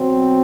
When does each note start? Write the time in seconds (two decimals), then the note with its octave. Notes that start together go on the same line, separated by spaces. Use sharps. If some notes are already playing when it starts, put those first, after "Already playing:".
Already playing: B2 F#3 C4